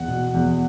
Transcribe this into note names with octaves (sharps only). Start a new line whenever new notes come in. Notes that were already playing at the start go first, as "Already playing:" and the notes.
Already playing: E2 F#5
B2
E2